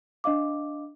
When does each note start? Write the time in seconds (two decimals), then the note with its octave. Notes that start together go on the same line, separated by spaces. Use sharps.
0.24 D4 D#5 F5 D6